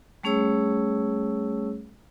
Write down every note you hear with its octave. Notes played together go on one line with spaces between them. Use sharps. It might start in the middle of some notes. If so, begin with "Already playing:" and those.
G3 A3 C#4 G#4 C#5 E6